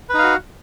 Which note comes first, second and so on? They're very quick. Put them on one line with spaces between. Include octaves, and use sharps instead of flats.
B4 D#4 F5 F#4